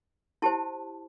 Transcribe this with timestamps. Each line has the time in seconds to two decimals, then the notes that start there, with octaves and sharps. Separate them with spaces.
0.42 E4 G4 C5 A5